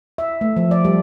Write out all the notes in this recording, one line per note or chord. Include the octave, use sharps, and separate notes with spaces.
E5
A3
F3
D5
G3